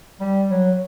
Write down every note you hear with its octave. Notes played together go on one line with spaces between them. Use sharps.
G3
F#3